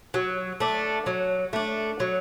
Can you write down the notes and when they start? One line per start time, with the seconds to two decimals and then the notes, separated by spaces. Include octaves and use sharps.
0.14 F#3
0.60 A3 D4
1.06 F#3
1.53 A3 D4
2.00 F#3